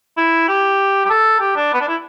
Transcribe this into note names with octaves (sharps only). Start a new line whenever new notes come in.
E4
G4
G4
A4
G4
D4
B3
D4
E4